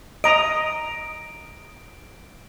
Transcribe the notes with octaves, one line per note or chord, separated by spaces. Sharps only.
D#5 A#5 D#6 D7